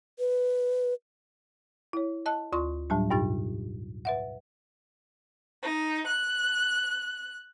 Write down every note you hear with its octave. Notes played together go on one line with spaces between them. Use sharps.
B4
E4 C#5
D#5 A5 F#6
D2 F4 C6 C#6
A2 F#3 G3 D4
G2 B2 D#4 G4 A6
B4 E5 F#5
D#4
F#6